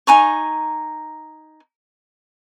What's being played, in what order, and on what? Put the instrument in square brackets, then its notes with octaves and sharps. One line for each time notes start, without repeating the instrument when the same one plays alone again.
[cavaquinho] D#4 G#5 A#5 C#6